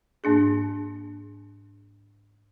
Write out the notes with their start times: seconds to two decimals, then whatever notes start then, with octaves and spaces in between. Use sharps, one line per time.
0.24 G#2 A#3 D4 G#4